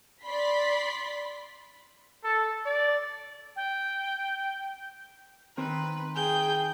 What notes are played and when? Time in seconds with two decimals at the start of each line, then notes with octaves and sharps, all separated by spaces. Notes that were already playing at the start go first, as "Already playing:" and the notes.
0.23 D5 B5 C6 B6
2.24 A4
2.66 D5
3.56 G5
5.57 D#3 C4 B4 C5
6.16 G#4 G5 G6